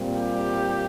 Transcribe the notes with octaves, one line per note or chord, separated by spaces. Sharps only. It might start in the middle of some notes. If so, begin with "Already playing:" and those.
Already playing: A#2 G3 C4
G4